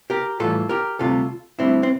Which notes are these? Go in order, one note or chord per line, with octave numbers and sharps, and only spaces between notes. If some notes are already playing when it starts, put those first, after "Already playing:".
G4 A#4
A2 E3 G3 F4 A4
G4 A#4
D2 C3 G3 F4 A4
D2 D3 G3 C4 E4
C4